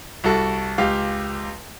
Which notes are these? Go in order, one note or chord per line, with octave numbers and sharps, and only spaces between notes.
C2 F#4 A4
C#2 G4 F5